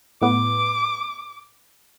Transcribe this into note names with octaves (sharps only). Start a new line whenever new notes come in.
A2 B3 D6